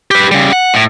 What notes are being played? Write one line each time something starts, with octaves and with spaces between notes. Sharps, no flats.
G4 B4
C#3 G3
F#5
A2